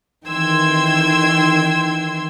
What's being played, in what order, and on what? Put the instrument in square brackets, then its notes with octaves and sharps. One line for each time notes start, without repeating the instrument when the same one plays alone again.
[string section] D#3 E3 G5 C6 E6 G#6